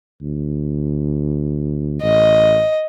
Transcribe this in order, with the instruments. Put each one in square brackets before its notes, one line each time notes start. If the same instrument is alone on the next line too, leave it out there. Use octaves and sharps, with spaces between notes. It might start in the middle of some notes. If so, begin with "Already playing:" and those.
[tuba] D2
[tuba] A1 [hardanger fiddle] D#5